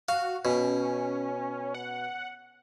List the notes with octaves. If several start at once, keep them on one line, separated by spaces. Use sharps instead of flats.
F#4 F5
B2 C#4
F#5